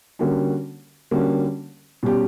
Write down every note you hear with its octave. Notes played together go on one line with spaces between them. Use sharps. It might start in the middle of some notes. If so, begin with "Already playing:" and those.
D3 G3 A#3 C#4 F#4
D3 G3 A#3 C#4 F#4
B2 G3 C#4 G4